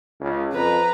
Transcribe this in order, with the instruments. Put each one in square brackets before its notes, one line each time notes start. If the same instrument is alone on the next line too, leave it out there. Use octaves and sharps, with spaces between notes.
[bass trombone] C#2
[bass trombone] F2 [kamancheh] B4 A#5